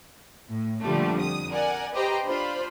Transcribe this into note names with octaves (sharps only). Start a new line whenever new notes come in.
A2
A#2 D3 F3 G3 A3
F2 D#6
A#4 D5 F#5 G#5
G4 B4 C5 D#5 G5 A#5
D4 F4 C5 B5